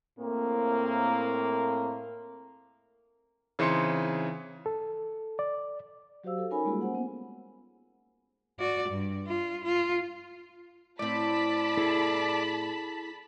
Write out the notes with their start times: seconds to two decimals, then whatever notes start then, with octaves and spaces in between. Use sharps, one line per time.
0.19 A2 A#3 C4
3.59 C#3 E3 C4 D#4 C6 C#7
4.66 A4
5.39 D5
6.24 F#3 F#4 G4 C5 F5 E6
6.38 F#4 A4
6.50 C#4 D#4 A#4 C#5 G#5 B5
6.65 G3 G#3 A#3 F4 F#4 G#4
6.81 A#3 C#4 C5 F#5
6.95 B3
8.59 F#4 D5
8.89 G2
9.27 F4
9.64 F4
10.99 A2 C4 D5 A5 B5 B6
11.77 E4 G#4 A4